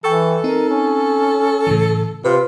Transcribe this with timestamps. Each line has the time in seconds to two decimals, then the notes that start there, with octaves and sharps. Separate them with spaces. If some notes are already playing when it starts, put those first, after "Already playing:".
0.04 E3 A4 G5 C#6 E6
0.44 C4 D#4 A#4
0.69 C#4
1.67 A2 C#3 E3
2.24 C3 F4 B4